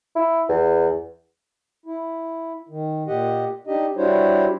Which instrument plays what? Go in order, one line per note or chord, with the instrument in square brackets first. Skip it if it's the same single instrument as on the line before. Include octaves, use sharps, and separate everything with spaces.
[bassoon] E4
E2
[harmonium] E4
D#3
A#2 G4 D#5 F#5
D4 D#4 G4 D#5
G3 D4 E4 F#4 C5 C#5